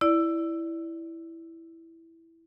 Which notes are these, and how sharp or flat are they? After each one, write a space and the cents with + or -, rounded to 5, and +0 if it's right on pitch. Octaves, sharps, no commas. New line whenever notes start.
E4 +0 D5 +0